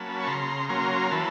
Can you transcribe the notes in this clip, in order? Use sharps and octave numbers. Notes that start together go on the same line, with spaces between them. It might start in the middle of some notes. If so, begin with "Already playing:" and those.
Already playing: F#3 A#3 C#4 A5 B5
C#6
C#3 A#5 C6
F#3 A#3 C#4 A#5 C6
E3 A5 B5